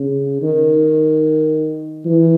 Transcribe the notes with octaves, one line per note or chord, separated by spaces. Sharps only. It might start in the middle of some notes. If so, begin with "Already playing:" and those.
Already playing: C#3
D#3
E3